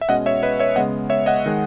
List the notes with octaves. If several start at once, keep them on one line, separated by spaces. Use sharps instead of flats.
E5
B2 G#3 C#4 D#5 F#5
C#5 E5
B4 D#5
C#5 E5
C#3 G#3 B3 D#5 F#5
C#5 E5
D#5 F#5
D#3 G#3